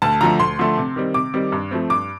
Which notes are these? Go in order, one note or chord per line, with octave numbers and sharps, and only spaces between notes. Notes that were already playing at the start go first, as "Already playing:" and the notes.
D2 A5
D3 F3 A3 A#5
D2 C6
D3 F3 A3
C3
D#3 G3 C4
C3 D6
D#3 G3 C4
G2
F3 A3 C4
G2 D6